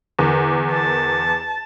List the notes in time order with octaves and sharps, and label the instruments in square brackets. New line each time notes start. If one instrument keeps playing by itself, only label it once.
[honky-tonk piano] E2 [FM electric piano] D3 A#4 D6
[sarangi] A5